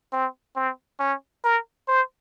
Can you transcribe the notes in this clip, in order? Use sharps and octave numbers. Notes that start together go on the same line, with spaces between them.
C4
C4
C#4
A#4
C5